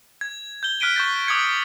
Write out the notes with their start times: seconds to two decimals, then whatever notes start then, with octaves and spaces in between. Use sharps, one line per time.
0.21 G#6
0.63 G6 G7
0.80 F6 F#6 B6 D7 D#7 G7
0.96 C#6 G6 A6
1.27 D6 D#6 F#6 G#6 C#7